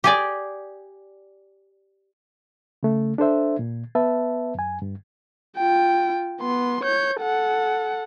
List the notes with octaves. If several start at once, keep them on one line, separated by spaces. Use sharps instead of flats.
G4 G#4 D5
C#3 A3
D4 A4 C5 E5
A#2
B3 B4 E5 A5
F#2 G#5
G2
F4 G5
B3 C6
C#5 G6
A4 F#5